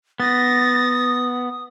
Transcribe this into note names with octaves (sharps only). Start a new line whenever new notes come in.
B3 D#6 A6 A#6